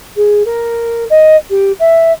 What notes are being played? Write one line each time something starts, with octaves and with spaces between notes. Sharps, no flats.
G#4
A#4
D#5
G4
E5